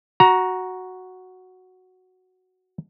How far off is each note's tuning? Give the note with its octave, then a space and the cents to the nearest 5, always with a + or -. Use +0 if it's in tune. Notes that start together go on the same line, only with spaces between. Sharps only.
F#4 +0 A#5 +15